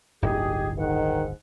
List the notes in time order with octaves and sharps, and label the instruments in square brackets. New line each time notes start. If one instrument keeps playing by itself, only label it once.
[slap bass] D1 G1 [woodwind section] D#4 G4 G#4
[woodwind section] G#2 F#5 [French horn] D#3